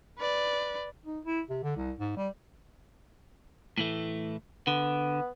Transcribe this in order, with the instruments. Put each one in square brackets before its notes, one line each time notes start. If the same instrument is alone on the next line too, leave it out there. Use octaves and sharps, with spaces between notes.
[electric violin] B4 D5
[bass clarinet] D#4
E4
C3
D3
C2
G#2
G3
[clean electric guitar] A2 E3 A3
[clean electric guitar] D3 [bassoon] B3